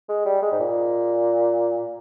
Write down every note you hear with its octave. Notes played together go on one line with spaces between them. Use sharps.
G#3
G3
G#3
G#2
A#2